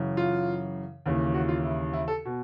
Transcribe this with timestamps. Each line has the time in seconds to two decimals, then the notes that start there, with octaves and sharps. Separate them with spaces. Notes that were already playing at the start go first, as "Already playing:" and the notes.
Already playing: F#2 C#3 E3
0.17 F4
1.06 D#2 C#3 E3
1.34 F#4
1.48 F4
1.64 E4
1.93 E4
2.08 A4
2.25 B2